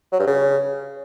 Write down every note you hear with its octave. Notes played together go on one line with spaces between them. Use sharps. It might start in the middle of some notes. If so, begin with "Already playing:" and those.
F#3
G2
C#3